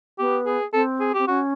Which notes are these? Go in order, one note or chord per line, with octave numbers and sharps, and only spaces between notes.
B3 G4
G#4
C4 A4
G#4
C4 G4
C#4 F#4